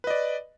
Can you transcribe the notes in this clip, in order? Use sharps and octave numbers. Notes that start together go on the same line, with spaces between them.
B4 D5 D#5